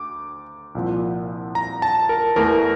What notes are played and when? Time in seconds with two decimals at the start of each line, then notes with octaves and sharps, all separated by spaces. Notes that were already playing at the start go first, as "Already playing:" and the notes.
Already playing: D2 D6
0.75 C2 A#2 F3
1.55 A#5
1.82 A5
2.09 A#4
2.36 E2 E3 A3 A#4